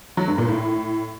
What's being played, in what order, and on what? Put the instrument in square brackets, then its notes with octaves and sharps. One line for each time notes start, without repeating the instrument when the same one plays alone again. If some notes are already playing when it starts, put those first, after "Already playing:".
[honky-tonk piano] F#3
G2
A#2
A2